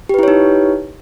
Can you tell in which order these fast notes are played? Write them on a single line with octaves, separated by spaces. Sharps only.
G4 B4 E4 C#5 D#4